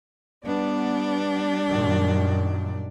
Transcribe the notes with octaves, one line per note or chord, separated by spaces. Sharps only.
G3 B3 D4 D5
F#2 A#2 D#3